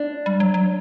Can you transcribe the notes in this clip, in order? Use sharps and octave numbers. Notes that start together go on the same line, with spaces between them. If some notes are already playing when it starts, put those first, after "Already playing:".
Already playing: D4
G3
F#3
F#3